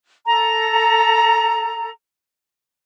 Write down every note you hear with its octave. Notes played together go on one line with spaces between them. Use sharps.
A4 A#5